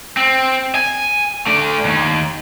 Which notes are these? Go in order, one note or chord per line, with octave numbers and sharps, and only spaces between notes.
C4
G#5
A3 D4
D#2